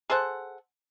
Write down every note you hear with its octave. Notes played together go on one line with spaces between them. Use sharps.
G#4 A4 C5 F#5